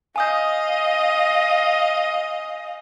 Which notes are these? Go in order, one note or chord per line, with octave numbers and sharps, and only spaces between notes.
D#5 F5 G#5 D#6 G6